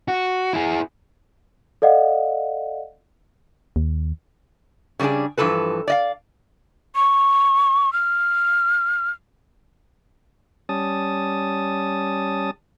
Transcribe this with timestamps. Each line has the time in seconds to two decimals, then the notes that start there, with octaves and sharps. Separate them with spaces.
0.08 F#4
0.53 E4 G#4
1.82 A4 D5 D#5 F5 F#5
3.76 D#2
4.99 C#3 G3 A3 D4 G#4
5.38 G2 E3 F3 A4 B4
5.88 D5 D#5 F5
6.96 C#6
7.93 F6
10.69 G3 C#4 A5 D#6